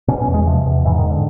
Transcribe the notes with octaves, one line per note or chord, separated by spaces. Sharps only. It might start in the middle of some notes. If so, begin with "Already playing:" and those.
B2 C#4
C#4
E2
G#3
C3 F3
E2
G#2 E3
D#3
G#2
D3